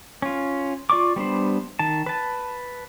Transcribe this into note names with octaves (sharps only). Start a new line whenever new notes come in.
C#4 F4
F4 D5 C#6 D6
G3 B3 D4 C5
D#3 A5
B4 A5